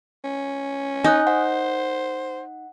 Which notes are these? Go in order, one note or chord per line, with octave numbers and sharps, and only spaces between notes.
C#4
D#4 G#5 D#6 F#6
C5 F#5